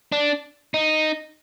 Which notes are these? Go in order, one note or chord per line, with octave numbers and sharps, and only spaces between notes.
D4
D#4